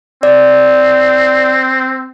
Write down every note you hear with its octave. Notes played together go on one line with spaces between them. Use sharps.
C4 D5